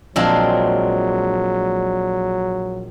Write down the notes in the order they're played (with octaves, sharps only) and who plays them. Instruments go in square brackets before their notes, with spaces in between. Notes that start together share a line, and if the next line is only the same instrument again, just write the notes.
[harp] A#1 F5 C6 [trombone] F#3 [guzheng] G#3 C4 D4